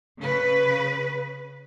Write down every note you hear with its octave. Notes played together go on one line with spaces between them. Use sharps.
C#3 B4